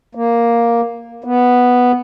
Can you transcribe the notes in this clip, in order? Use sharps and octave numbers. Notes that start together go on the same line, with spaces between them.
A#3
B3